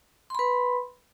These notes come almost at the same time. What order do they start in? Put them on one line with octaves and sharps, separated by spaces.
C6 B5 B4